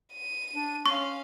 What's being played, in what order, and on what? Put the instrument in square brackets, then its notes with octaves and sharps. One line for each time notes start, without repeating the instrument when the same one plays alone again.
[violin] D#7
[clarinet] D4
[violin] C#4 F5 [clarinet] C6 [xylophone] C#6